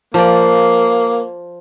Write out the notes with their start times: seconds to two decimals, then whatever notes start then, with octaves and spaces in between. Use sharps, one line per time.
0.14 F3 A#3 D5